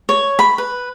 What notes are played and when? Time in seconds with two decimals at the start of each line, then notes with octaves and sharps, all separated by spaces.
0.09 C#5
0.39 B5
0.58 B4